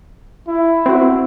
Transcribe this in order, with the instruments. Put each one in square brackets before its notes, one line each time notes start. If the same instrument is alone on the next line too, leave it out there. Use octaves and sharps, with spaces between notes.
[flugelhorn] E4
[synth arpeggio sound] C4 F#4